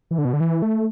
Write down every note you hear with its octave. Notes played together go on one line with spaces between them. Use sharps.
E3
D3
B2
D3
E3
A3